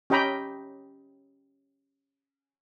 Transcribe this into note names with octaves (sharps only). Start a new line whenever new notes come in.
C#4 G4 D#5 G5 A#5 B5